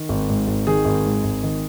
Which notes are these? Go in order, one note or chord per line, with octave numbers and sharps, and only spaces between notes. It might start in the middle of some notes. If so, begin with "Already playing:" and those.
Already playing: D#3
G#1
G#2
G#1
D#3 G#4
G#1
G#2
G#1
D#3